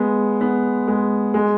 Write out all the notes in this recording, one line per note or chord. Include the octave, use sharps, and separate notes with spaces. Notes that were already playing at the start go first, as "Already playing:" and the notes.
Already playing: G#3 B3
B3
G#3
G#3